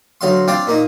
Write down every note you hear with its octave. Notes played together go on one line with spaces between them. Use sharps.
D2 F#3 F5 C6
C4 D4 F4 F5 G5
A#2 A#3 D#4